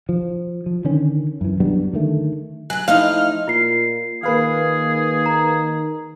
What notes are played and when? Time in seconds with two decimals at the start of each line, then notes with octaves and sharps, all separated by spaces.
0.09 F3
0.66 F3
0.85 D3 D#3 C#4
1.41 F#2 E3
1.60 F#3 G3 B3 D4
1.93 D3 D#3 A3
2.70 G#2 F#3 G#5 F#6
2.88 F3 A3 D#4 E4 D#5 F5 F6
3.48 A#2 F4 C7
4.23 D#3 A#3 G#4 B4 F5
5.26 A#5